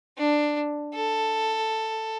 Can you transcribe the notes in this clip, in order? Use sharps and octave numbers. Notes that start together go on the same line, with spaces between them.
D4
A4